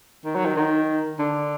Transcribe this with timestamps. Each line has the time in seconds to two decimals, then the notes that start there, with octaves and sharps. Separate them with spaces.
0.25 D#3
0.35 F#3
0.46 D#3
0.56 D#3
1.19 D3